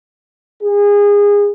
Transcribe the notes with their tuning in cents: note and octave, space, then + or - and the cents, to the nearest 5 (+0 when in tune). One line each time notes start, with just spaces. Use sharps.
G#4 -25